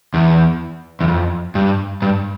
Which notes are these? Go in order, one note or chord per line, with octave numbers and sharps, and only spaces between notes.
E2
E2
F2
G2
G2